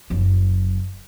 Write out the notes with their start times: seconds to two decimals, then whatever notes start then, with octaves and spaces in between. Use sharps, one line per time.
0.10 F#1 F#3